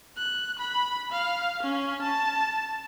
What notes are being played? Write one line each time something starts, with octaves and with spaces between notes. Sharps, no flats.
F#6
B5
F5
C#4
A5